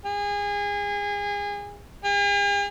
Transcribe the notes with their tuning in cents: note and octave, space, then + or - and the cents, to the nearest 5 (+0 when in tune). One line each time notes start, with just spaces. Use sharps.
G#4 -30
G#4 -45